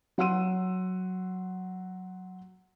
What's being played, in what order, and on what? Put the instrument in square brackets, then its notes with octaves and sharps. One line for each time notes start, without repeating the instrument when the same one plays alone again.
[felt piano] F#3 F#5 C6 E6 D#7